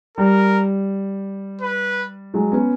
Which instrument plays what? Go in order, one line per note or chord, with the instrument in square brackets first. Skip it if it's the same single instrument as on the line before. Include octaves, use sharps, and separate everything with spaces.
[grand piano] G3 [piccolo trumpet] A#4
[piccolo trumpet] B4
[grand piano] F#3 G#3
B3 C#4